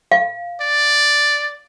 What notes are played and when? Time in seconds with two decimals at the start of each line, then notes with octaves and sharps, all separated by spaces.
0.12 F5
0.61 D5